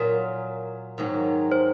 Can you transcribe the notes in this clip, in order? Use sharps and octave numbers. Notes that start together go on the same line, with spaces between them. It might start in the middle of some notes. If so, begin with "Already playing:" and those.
Already playing: A#2 F#3 C#4 F4 A#4
G#2 D#3 F#3 A#3 C#4
C5